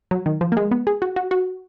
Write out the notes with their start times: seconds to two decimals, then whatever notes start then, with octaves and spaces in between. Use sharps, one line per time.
0.11 F#3
0.26 D#3
0.41 F3
0.52 A#3
0.57 G#3
0.71 B3
0.87 G#4
1.02 F#4
1.16 F#4
1.31 F#4